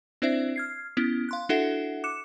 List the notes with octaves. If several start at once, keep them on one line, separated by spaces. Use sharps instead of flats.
C4 D4 E4 C5 D5 E5
F6 G#6 C7
B3 C#4 E4
F5 C6 F#6
D4 E4 F#4 A4 E5 F#5
D6 F#6 C#7 E7